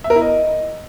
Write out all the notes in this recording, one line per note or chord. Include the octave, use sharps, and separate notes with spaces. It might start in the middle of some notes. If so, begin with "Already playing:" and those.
E5
A#4
E4
D#5